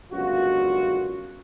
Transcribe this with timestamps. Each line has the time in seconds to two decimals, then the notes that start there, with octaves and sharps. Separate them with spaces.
0.12 G1 C#2 F#2 F4 F#4